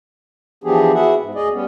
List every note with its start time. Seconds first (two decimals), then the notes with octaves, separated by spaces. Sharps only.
0.64 E3 F3 B3 D4 G4 G#4
0.94 B3 E4 F#4 G#4 E5 F#5
1.19 G#2
1.34 D2 G#4 D5 D#5
1.53 G3 B3 C#4